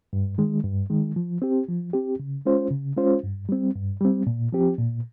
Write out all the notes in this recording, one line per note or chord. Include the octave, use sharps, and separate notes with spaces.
G2
D#3 G#3
G2
D#3 G#3
F3
C4 G4
F3
C4 G4
C#3
G#3 C#4 F4 C5
C#3
G#3 C#4 F4 C5
G2
G3 C4
G2
G3 C4
A#2
F3 C4 G4
A#2